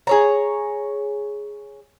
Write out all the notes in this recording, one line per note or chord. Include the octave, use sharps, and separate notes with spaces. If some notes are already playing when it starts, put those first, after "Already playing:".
G#4 C#5 A#5